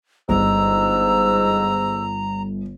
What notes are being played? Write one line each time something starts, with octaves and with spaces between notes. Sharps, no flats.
G1 G#2 A#5 E6